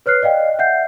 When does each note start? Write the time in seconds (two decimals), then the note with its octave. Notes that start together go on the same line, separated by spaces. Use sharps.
0.06 B4 C#5 F6 F#6 C7
0.23 D5 D#5 F5 G5
0.59 E5 F#5 G6 C7